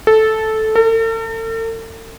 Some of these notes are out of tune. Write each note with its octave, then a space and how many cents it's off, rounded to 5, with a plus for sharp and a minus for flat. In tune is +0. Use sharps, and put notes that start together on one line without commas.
A4 -10
A4 +45